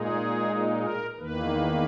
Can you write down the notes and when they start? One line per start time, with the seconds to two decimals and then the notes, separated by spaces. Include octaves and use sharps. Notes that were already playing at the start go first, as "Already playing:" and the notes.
Already playing: A#2 G#3 D#4 G#4
0.77 A#4
1.18 E2 D#3 A#3 B4